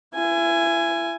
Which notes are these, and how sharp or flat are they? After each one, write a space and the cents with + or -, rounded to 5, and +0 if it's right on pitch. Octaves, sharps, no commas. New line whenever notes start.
E4 +35 G#5 +0